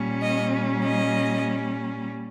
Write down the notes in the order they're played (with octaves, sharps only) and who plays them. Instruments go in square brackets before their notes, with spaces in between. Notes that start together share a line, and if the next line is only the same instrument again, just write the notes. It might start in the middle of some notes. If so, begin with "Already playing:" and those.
Already playing: [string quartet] A#2 G3 C#4
D#5
D#5